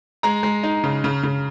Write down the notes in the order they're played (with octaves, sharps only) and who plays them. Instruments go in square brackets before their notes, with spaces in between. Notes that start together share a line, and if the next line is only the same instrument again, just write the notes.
[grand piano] G#3 A#5
G#3
D#4
C#3
C#3
C#3